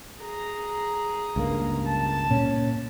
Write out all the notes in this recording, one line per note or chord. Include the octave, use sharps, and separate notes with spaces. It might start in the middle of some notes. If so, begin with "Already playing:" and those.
G#4 A#5
C#2 G2 A#3
A5
A#2 C#4